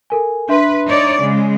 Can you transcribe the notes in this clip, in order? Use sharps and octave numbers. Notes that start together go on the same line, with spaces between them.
A4 A#4 G#5
D4 B4 E5 C6
D#4 C#5 D5
C#3 G#3